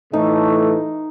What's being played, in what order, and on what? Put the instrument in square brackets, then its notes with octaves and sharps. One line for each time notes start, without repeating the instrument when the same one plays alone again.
[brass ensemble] A2 E3 A3 [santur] D#4